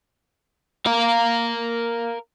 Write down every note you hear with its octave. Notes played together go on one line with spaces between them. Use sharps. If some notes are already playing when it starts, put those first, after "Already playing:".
A#4 F5